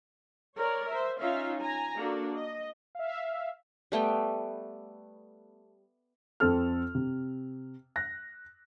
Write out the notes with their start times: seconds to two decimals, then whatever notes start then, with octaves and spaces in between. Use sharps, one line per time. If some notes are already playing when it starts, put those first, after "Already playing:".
0.56 A#4 C#5 D5
0.89 C5 E5
1.19 C#4 D#4 F4 E5 F5
1.60 G#5 A#5
1.96 A#3 D4 F#4 A4
2.34 D#5
2.95 E5 F5
3.92 G3 A3 B3 G5
6.40 F2 C4 A4 F6
6.95 C3
7.96 F#6 A#6